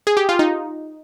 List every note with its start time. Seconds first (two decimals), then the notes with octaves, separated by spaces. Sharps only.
0.07 G#4
0.17 G4
0.29 F4
0.39 D#4